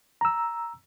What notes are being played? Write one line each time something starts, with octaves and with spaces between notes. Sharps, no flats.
A#5 E6